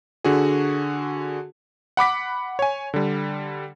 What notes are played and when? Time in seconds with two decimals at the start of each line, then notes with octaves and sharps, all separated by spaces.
0.24 D3 F#4 G#4
1.97 F#5 B5 D6 B6
2.59 C#5 G#5
2.94 D3 G3